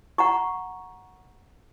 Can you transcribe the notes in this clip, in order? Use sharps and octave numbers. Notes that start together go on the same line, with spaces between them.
F#5 A#5 C#6